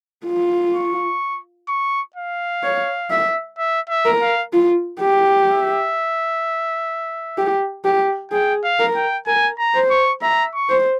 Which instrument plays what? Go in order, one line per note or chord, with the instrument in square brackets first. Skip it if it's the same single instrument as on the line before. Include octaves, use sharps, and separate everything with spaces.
[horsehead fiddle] F4
[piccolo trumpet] C#6
C#6
F5
[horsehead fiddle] C#5
E5
[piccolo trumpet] E5
E5
[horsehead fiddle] A#4
[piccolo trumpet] F5
[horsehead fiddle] F4
G4
[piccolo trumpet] E5
[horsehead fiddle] G4
G4
[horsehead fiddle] G#4 [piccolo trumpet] G5
[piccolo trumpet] F5
[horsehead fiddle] A#4
[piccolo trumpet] G5
[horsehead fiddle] A#4 [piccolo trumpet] G#5
[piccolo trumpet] A#5
[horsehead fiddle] C5
[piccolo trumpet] C#6
[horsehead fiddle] E5 [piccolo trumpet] A#5
[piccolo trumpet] C#6
[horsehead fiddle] C5